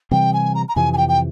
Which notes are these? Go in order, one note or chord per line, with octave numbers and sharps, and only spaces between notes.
C3 E3 G3 C4 G5
G#5
A#5
A#5
F2 C3 E3 G#5
G#5
G5
G5